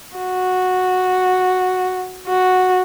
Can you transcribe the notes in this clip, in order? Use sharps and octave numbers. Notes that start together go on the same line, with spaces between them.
F#4
F#4